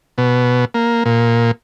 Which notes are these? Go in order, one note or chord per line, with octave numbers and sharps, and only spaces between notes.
B2
A#3
A#2